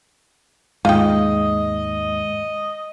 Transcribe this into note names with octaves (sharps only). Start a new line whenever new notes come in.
D#2 G#2 G#3 F4 D#5 G5